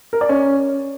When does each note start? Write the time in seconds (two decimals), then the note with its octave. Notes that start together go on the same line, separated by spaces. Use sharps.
0.13 A#4
0.21 D5
0.29 C#4